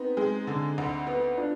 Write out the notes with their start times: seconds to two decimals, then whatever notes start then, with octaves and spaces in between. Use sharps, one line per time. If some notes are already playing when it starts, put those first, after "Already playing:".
Already playing: B3 C4 D#4
0.17 G#3
0.47 D3
0.78 D2
1.07 B3
1.37 D4 F4